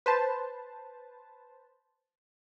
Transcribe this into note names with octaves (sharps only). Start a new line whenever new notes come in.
B4 C5 A5